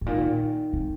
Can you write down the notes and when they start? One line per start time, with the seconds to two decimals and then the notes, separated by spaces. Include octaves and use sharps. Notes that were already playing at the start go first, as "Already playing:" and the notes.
0.01 A2
0.06 A#2 D#3
0.73 C3